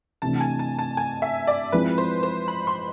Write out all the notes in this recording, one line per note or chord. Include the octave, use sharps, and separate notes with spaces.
C3 E3 A3 D4 A5
G#5
A5
A5
G#5
E5
D5
F3 G#3 C4 E4 B4
C5
C5
B5
C6